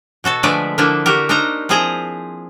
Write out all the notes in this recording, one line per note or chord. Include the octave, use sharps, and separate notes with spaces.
B2 F#4 A4 A5
D3 F3 G#3 A3 B4 D5
D3 F3 A#3 D4 E4
F#4 G4 A#4
D4 D#4 A#4 C5 A#5
F3 C4 E4 G#4 C5 A#5